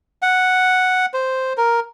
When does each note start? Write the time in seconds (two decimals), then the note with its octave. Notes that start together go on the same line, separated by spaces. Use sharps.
0.22 F#5
1.14 C5
1.57 A#4